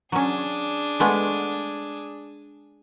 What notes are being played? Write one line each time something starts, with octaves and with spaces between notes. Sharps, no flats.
F#3 C#4 D4 G#4
G#3 A3 B3